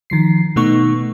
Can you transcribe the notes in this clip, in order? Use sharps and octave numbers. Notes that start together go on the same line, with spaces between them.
D#3 F3 C7
B2 A3 B3 D#4 C#6